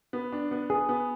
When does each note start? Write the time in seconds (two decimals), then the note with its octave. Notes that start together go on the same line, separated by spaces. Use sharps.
0.13 B3
0.32 D4
0.51 B3
0.70 B3 G#4
0.89 B3